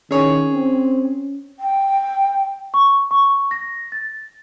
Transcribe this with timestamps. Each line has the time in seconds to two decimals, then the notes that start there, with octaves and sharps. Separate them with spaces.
0.11 D#3 C#4 G#4 C#5
0.52 C4
1.60 G5
2.74 C#6
3.11 C#6
3.51 A#6
3.92 A6